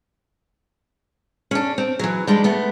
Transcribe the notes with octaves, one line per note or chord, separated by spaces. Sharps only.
C#4 D4
C4
E3 F#3
G3 G#3 D4
A3 B3